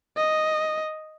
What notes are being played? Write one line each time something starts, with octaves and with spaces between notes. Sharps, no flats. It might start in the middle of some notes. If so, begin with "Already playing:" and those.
D#5